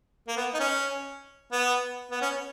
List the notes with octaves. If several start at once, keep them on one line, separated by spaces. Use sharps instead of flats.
A#3
B3
D#4
C#4
B3
B3
C#4